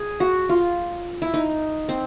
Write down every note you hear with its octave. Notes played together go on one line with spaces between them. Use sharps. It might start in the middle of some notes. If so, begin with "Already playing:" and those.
Already playing: G#4
F#4
F4
E4
D#4
C4